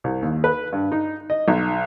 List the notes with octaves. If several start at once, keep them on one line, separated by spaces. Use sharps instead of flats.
C2
D#2
B4
G2
D#4
D#5
B1